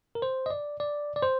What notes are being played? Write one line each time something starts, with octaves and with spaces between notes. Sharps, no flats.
A#4
C5
D#5
D5
D5
D5
C5